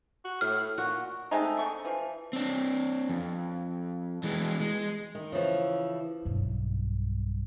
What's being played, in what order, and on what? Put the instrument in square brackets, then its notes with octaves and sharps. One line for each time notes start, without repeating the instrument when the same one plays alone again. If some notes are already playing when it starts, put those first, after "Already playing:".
[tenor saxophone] F#4
[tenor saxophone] A2 [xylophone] F6
[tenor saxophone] A#2 [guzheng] F#4
[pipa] G#3 A3 C4 D#4
D3 C#6
E3 F3
[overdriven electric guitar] C4 D4
F2
E3 G#3
G#3
[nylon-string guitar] D#3
C#3 E3 F3
[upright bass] B1 G2